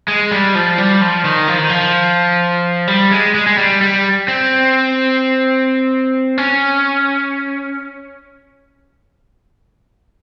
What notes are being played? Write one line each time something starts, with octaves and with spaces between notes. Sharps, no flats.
G#3
G3
F3
G3
F3
D#3
F3
D#3
F3
G3
G#3
G#3
G#3
G3
G3
C4
C#4